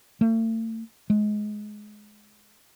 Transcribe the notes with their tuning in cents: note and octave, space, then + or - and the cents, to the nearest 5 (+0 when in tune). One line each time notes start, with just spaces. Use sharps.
A3 +40
G#3 +20